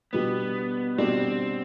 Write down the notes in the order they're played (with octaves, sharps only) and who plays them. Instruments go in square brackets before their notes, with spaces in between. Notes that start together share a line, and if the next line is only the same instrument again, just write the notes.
[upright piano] B2 G3 D4 F#4 [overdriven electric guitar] B3
[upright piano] B2 G3 D4 F#4 [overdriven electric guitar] C4